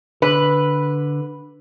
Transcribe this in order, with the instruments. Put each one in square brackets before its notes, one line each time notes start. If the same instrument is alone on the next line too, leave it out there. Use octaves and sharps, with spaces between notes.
[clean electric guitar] D3 [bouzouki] B4